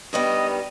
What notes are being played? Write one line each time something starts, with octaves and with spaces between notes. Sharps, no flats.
G2 D#3 G3 B3 D#5